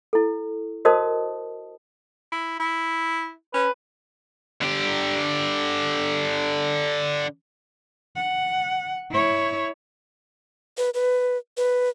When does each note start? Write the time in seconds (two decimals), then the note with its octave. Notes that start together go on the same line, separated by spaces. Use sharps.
0.13 E4 A4
0.85 F#4 A#4 C5 D#5 A5 D#6
2.32 E4
2.60 E4
3.54 C#4 B4
4.62 D3 G4
8.16 F#5
9.11 E4 C#5
10.78 B4
10.94 B4
11.57 B4